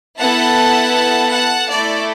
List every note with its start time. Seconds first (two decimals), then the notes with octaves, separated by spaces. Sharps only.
0.19 B3 E4 A4 F#5 A5
1.30 F#5 A5
1.67 A3 E4 A4 D5